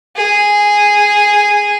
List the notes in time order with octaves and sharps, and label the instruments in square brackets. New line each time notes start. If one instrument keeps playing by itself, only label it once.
[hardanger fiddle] G#4